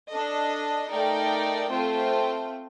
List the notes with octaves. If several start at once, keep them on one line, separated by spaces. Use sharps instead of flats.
D4 A4 D#5
A3 D#4 A#4 D5 G5
A3 C4 F4 C5 G5